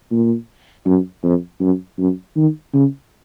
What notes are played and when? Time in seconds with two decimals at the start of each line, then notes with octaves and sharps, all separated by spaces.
0.11 A#2
0.86 F#2
1.24 F2
1.61 F#2
1.98 F#2
2.36 D#3
2.74 C#3